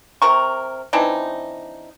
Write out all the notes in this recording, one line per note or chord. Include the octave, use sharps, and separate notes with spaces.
C3 A#4 C#6
E3 C4 D4 D#4